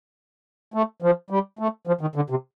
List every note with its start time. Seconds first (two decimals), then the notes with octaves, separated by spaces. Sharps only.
0.74 A3
1.02 F3
1.30 G3
1.59 A3
1.87 F3
2.01 D#3
2.16 D3
2.30 C3